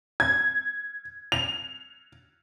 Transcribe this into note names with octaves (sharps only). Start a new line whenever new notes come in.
G#6
F7